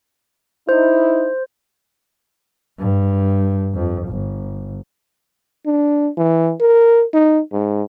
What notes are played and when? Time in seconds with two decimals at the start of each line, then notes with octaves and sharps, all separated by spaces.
0.69 D#4 E4 C5
2.79 G2
3.74 F2
4.08 G1
5.66 D4
6.17 E3
6.60 A#4
7.14 D#4
7.53 G#2